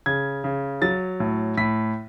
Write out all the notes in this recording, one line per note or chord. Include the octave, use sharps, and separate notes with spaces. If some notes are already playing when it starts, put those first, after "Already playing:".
C#3 G#6
C#3
F#3 A6
A2
A2 B6